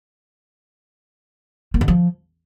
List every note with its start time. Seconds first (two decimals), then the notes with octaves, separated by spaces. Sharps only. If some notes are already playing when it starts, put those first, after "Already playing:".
1.74 A#3
1.81 D3
1.88 F3